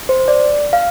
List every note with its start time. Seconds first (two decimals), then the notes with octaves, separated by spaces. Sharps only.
0.09 C5
0.28 D5
0.73 F5